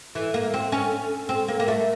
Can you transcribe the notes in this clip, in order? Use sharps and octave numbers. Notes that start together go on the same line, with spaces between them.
E3 A4
A#3
C4
C#4
C4
A#3
A#3
A3 A#4